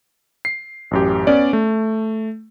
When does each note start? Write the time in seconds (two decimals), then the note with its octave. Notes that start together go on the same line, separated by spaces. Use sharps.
0.45 C7
0.91 A1 F#2 G4
1.27 B3 C#4 D5
1.53 A3